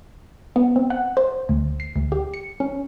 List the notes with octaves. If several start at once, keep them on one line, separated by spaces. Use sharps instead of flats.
B3
C4
F#5
C5
D2
C7
D2
G4
C#7
C#4